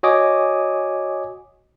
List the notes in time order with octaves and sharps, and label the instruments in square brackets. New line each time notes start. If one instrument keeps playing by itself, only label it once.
[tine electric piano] F#4 C#5 D#5 G#5 D6 D#6